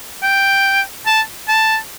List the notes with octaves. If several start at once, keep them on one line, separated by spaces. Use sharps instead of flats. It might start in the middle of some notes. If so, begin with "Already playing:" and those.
G5
A5
A5